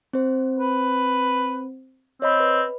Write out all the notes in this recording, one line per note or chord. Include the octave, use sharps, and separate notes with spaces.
C4 C5
B4
C4 C#5 D#5 B5
B4